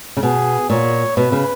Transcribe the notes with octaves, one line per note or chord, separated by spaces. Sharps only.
C#3
B2 G#4
A#2 C#5
B2 B4
C#3